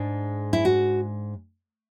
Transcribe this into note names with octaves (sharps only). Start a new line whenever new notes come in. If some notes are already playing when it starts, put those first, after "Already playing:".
Already playing: G#2 G#3 D4
E4
F#4